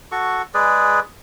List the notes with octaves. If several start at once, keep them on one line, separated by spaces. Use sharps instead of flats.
F#4 A4 C#6
G#3 G#4 B4 D5